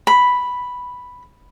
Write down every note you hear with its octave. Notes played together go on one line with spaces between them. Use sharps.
B5